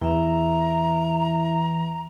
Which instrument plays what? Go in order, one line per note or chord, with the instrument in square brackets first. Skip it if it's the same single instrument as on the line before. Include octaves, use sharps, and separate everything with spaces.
[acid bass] E2 [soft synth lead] E3 [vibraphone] E4 E5 [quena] A#5